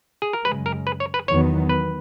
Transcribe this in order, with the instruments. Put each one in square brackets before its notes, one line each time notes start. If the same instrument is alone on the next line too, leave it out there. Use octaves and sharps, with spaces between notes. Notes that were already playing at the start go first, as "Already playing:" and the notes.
[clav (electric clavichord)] G#4
A#4
[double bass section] F#2 C#3 G#3 [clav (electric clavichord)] B4
[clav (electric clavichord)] A#4
B4
C#5
B4
[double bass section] E2 D#3 F#3 B3 [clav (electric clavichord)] C#5
[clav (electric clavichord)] B4